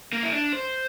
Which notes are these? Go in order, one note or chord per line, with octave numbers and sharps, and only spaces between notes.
A#3
E4
D4
C5